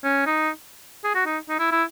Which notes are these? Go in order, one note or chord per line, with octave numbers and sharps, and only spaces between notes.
C#4
D#4
G#4
F#4
D#4
D#4
E4
E4